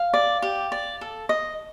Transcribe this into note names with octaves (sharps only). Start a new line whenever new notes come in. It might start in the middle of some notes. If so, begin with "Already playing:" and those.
Already playing: F5
D5
G4
D5
A4
D#5